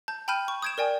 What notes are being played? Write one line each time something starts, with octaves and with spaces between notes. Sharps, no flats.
A5 G6
G5 A5 B5 F6 G6 D#7
C#6
D#6 G6 G#6 D7 E7
A#4 D5 G5 G#5